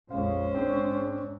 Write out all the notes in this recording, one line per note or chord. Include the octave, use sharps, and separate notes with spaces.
A#1 F2 G#3 C#4 C5 F5
G#2 C4 D4